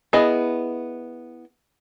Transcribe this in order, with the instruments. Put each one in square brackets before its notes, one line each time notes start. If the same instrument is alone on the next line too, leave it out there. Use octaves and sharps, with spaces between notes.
[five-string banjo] B3 E4 G#4 D#5